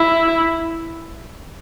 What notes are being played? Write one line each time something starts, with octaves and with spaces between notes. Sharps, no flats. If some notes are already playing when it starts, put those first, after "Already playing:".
Already playing: E4